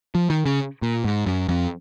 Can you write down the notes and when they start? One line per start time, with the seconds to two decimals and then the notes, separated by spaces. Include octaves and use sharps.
0.15 F3
0.30 D#3
0.46 C#3
0.82 A#2
1.04 G#2
1.26 F#2
1.48 F2